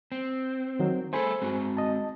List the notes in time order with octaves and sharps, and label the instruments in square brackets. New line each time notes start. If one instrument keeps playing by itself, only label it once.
[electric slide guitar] C4
[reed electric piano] D#3 F#3
[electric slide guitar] A3 G#4 A4 [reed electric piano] C5 G#5 B5
[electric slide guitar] G#3 C4 F#4
[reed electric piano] D#5 A5